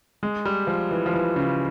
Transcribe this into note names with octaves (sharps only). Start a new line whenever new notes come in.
G#3
G3
F3
E3
F3
E3
C#3